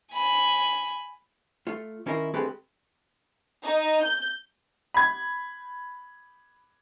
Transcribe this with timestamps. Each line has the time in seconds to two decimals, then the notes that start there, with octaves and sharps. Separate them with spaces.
0.13 G#5 B5
1.67 A3 F4
2.06 D#3 C#4 E4 F4 A#4
2.34 D3 G#3 A3 C4 G4 B4
3.63 D#4
4.03 G6
4.94 B5 G#6